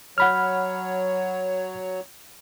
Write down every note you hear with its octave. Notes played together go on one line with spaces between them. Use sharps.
F#3 C#5 F#5 B5 F6